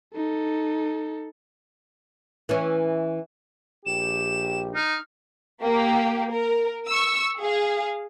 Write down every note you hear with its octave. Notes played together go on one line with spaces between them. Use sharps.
D#4 A4
E3 C#4
A#1 G4 E7
D#4 F6
A#3 G4
A#4
C#6 E6
G#4 F5